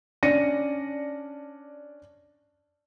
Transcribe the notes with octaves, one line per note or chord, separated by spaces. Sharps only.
C#4 D4 D5 A#6 C#7 D#7